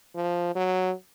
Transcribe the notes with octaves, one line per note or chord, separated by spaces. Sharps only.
F3
F#3